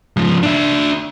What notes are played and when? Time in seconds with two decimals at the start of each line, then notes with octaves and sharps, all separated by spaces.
0.17 G#2 F3
0.43 D4 E5